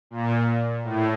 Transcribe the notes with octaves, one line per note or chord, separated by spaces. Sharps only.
A#2
A2